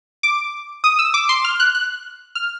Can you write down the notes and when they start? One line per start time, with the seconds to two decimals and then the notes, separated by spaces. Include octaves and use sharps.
0.23 D6
0.84 D#6
0.99 E6
1.14 D6
1.29 C6
1.45 F6
1.60 F#6
1.75 F#6
2.35 F6